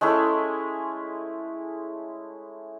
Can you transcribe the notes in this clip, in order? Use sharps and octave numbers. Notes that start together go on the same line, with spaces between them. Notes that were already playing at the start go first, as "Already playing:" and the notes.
G#3 A3 C#4 E4